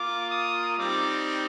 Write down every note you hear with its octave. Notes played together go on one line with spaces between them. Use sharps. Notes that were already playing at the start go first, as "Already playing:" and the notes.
Already playing: A#3 F4 D6
D#6
G3 C4 D#4 D6